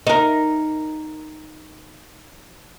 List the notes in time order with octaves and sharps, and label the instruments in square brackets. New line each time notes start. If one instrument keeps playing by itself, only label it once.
[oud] D#4 A#4